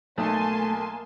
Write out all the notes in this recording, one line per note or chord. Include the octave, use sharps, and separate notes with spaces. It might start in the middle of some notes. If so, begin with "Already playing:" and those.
B1 A3 A#3 G#5 A5 C6